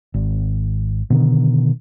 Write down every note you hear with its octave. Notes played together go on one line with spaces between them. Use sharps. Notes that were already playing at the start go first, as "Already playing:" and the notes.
G#1
B2 D3 D#3